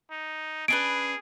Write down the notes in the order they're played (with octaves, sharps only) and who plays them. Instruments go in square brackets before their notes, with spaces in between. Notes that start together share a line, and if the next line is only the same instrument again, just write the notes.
[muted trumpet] D#4
[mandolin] C#4 D4 B4 [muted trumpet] G#4 [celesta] D7